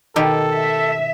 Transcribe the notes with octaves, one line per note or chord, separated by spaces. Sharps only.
B2 D#3 G4 A4
E5